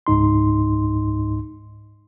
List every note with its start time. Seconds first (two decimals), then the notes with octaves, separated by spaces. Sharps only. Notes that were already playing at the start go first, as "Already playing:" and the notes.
0.07 C#2 G#2 D#4 C6